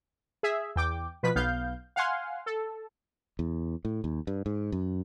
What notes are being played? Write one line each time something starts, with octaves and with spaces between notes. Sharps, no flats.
G#4 E5
E2 G5 D6
B2 F3 B4 B6
B1 B3 F5 G6
F5 F#5 G#5 C6
A4
E2
A2
D#2
G2
G#2
F#2